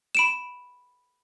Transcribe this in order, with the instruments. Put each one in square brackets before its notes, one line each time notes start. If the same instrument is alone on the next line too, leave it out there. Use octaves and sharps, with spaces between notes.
[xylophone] B5 D7 E7